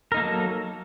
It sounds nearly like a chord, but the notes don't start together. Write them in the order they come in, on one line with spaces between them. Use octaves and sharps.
A#4 D#4 A#3 A4 F#3